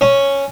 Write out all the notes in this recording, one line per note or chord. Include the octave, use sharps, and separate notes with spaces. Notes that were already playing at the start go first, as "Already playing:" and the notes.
C#4